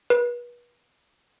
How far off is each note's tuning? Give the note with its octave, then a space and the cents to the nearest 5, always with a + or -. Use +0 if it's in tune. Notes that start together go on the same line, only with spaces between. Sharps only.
B4 -35